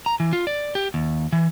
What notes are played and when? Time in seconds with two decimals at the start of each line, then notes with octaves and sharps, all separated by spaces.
0.06 A#5
0.20 E3
0.33 F4
0.47 D5
0.75 G4
0.94 D#2
1.33 E3